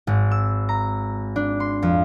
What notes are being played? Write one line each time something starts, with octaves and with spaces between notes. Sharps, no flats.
G#1
E6
A#5
D4
C6
F2